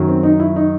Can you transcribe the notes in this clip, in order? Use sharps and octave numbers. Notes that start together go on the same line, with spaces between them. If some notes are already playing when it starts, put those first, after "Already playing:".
Already playing: F#2 D#3 F#3
C4
D#4
E4
D#4